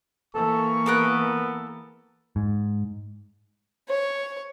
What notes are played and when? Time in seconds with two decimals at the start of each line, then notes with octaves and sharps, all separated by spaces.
0.35 E3 A#3 A4 C#6
0.86 B3 A4 A#4 F#6
2.36 G#2
3.89 C#5